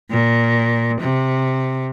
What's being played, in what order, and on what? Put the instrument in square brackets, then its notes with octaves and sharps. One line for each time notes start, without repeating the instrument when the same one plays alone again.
[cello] A#2
C3